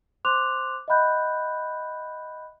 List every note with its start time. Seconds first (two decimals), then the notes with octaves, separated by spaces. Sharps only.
0.25 C5 C6 D6 F#6 F7
0.88 D#5 E5 F#5 B5 F#6 G6